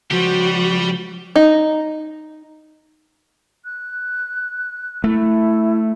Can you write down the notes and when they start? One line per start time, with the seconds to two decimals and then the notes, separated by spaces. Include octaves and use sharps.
0.11 C#2 F3 G3 F#4 G4
1.36 D#4
3.65 F#6
5.04 A3 E4